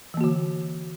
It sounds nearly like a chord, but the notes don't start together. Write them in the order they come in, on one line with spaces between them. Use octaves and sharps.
E3 A#3 F#4 D3